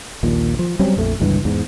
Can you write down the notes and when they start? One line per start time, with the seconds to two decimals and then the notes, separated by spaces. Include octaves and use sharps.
0.23 A#1 D#2 A#2
0.59 F3
0.79 F#3 G3 C4 C#4
0.96 A#1 F2 A3
1.20 G1 C#2 G2 E3
1.45 E2 G#2